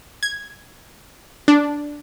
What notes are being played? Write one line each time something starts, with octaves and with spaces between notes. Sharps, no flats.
G#6
D4